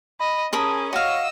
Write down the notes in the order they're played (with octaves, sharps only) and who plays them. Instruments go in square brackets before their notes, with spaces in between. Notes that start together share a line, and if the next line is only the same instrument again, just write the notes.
[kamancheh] D#5 [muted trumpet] B5
[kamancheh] C#4 G#4 [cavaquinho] A#4 B5 D#6 [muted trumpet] A5
[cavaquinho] F#4 F5 [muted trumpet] C#5 [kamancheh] D#5 E6